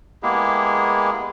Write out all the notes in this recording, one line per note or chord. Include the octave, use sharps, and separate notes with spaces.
G#3 A#3 B3 E4 G4 G#4